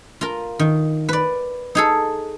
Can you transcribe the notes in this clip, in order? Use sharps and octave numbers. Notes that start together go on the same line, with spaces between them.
F4 A#4
D#3
B4 D5
D#4 G#4 A4